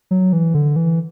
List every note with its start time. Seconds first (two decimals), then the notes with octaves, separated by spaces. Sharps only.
0.11 F#3
0.33 E3
0.54 D3
0.76 E3